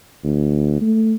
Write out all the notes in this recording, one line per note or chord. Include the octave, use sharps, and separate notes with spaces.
D2
A3